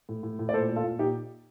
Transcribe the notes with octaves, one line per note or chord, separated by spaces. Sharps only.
A2
A2
A2
D5
A#2 A4 C5
A#2
F4 A4
A#2
A#2 D#4 G4